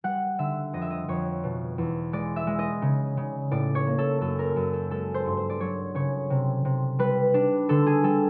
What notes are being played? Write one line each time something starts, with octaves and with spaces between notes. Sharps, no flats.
G3 F#5
D3 E5
F2 D#5
E5
D#5
F2 C#5
B2
E2
G#3 D5
E5
G#3
D#5
C#3
C#3
A2 D5
C#5
A#3
A4
F#2 A4
A#4
F#2 A4
A4
G#3 A4
C5
G2
C5
D5
F#3 C#5
C#3 C#5
C3
C3
G3 B4
D4
D3 A4
G#4
G3 A4